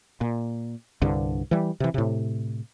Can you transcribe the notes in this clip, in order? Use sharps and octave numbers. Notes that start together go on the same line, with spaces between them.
A#2
C2 G2 D3
E3 G3
C3 E3
A2 C3